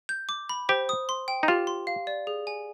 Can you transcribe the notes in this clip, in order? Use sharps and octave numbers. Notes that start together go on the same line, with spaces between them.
G6
D6
B5
G4 C5
D#6
C6
G5
D#4
F4 G4
C6
F5
D5
G#4
G#5